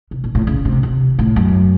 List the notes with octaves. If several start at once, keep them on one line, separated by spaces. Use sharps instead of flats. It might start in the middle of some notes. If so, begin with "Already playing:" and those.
C3
A#2
A2
C#3
C3
C3
A2
F#2